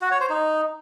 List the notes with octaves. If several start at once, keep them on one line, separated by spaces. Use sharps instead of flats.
F#4
C#5
C5
D#4